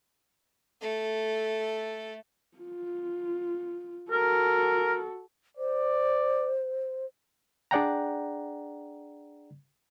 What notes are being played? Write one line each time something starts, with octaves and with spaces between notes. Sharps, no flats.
A3 A4
F4
F#4 A4 A#4
C5 D5
D4 G#4 D5 F#5 G5 A#5